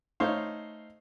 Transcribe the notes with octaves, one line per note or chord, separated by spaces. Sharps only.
A3 D#4 C5 C#5 F5